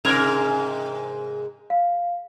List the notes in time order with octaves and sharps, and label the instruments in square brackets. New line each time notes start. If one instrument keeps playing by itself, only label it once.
[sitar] G#2 C3 A#4 [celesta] G#6 F7
[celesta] F5